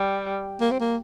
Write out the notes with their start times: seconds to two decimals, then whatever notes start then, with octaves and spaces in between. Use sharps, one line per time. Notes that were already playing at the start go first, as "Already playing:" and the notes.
Already playing: G3
0.60 A#3
0.71 C4
0.80 A#3